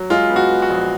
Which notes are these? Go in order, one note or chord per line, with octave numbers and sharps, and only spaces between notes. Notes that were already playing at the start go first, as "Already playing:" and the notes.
Already playing: F#3
G#3 F4
B3
F#4
B3
F#4
A#1